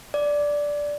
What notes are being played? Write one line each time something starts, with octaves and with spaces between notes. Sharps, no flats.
D5